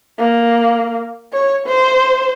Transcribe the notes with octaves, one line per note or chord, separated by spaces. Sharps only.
A#3
C#5
C5